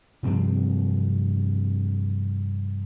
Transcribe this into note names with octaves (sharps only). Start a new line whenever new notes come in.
G2 C3 F3 C4